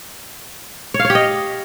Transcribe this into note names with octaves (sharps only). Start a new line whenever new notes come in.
C#5
F5
C#5
G4
D#5